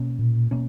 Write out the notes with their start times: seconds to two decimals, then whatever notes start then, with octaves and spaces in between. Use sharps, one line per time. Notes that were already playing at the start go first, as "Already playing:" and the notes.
Already playing: B2 A#3 C#4
0.19 A#2
0.51 B2 A#3 C#4